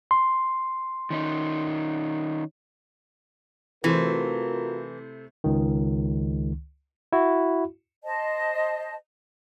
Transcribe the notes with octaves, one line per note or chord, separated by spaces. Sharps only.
C6
D#3 C#4 D#4
C3 E3 A3 F4 F#4 A#4 C5
C#2 D#3
E4 F#4
C5 D#5 A5